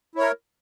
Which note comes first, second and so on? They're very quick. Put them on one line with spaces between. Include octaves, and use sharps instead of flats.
E4 C#5 A#4